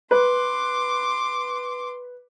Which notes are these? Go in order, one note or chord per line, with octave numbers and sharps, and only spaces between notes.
B4 C6 D6